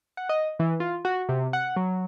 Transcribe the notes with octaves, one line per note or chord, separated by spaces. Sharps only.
F#5
D#5
E3
F4
F#4
C3
F#5
F#3